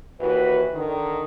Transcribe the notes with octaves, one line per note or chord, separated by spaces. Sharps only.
D#2 E3 F#4 B4
D3 D#3